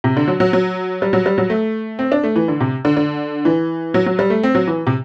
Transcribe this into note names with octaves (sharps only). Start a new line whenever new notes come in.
C3
D3
F#3
F#3
F#3
G3
F#3
G3
F#3
A3
C4
D4
A3
E3
D3
C3
D3
D3
E3
F#3
F#3
G3
A3
C4
F#3
E3
C3